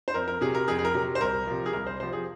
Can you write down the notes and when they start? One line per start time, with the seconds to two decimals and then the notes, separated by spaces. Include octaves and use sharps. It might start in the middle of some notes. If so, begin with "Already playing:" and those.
0.08 C5
0.14 F2 A#4
0.28 A#4
0.41 C3 F#3 G#4
0.55 A#4
0.68 F2 G#4
0.79 G#4
0.85 A#4
0.94 C3 F#3
1.15 C5
1.20 C2 A#4
1.47 C3 F3
1.66 G#4
1.73 C2 A#4
1.87 C5
2.00 C3 F3 C5
2.13 G#4